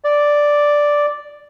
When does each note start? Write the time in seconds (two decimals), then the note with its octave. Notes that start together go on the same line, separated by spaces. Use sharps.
0.04 D5